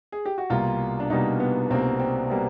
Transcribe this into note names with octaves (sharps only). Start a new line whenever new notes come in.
G#4
G4
F#4
C2 B2 G3 A#3 F4
D4
C2 B2 G3 A#3 D#4
B3
C2 B2 G3 A#3 C4
C4
B2 G3 A#3